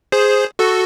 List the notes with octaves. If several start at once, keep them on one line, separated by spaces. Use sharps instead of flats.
G#4 C5
F#4 A4